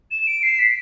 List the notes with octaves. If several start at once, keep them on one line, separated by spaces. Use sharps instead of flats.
E7
D7
C7
B6